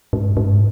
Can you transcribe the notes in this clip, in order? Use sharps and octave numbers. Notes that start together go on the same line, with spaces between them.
G#2
G#2